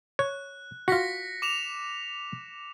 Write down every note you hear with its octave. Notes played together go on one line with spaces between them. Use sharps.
C#5 F#6
F4 F#4 A#6 B6 C#7
D6 E7 F7